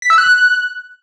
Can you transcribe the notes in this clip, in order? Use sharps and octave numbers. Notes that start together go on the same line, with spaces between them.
B6
E6
F#6